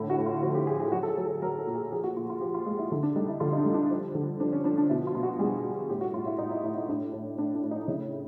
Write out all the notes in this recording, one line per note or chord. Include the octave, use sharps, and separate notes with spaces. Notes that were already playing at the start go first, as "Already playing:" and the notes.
Already playing: A2 D3
F#4
A2
F4
F3 F#4
G4
F3 G#4
G#4
F#3 F#4
A4
G#4
F#3
A4
F#3 A#4
A4
A#2
G#4
F3 G#4
F#4
A#2 F4
F4
F3 G4
F4
G#3
E4
D3 E4
D4
G3 D#4
E4
D3 F4
D#4
D4
G3
D4
F3
D3
F3 D4
C#4
F3 D4
D4
B2 E4
F4
B2
F#4
G3 G#4
B2
A2 G4
F#4
A2 F4
E4
A2 D#4
E4
A2 E4
E4
A2 D4
A2
A2 D4
D4
A2
D#4
C#3 E4